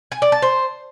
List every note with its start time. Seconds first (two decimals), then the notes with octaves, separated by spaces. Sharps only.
0.12 G#5
0.22 D5
0.32 A5
0.42 C5